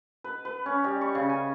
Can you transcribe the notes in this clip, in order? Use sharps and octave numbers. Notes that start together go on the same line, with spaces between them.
B4
B4
C#4
G3
C#6
C#3
G#5